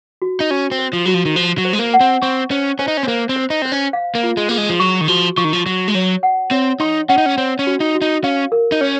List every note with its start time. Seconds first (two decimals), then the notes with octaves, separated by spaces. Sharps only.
0.22 F#4
0.40 D#4
0.51 C#4 F#4
0.72 C4
0.79 C5
0.93 F3
1.05 F#3 F#4
1.14 F3
1.25 D#3
1.36 F3 C5
1.58 F#3
1.65 C5
1.73 G#3
1.79 A#3
1.94 F#5
2.01 C4
2.22 C4 C#6
2.51 C#4 C5
2.79 C#4 C5
2.88 D#4
2.97 C#4
3.03 C4
3.07 A#3 C5
3.29 C4
3.36 C5
3.50 D#4
3.62 C4 C5
3.72 C#4
3.93 F5
4.15 A#3
4.23 F4
4.37 G#3
4.49 A#3 G#4
4.58 G#3
4.70 F3
4.80 F#3 C#6
5.01 D#3
5.08 F3 F#4
5.37 F3 C#6
5.44 D#3
5.53 F3
5.66 F#3 F#4
5.88 G#3
5.95 F#3 C#5
6.23 F#5
6.51 C4 C#5
6.80 D#4 C6
7.09 C#4 F#5
7.18 D#4
7.26 C#4
7.38 C4 C#5
7.59 C#4
7.67 F#4
7.80 D#4
7.95 F#4
8.02 D#4
8.24 C#4 F5
8.52 A#4
8.72 D#4
8.81 C#4 C#5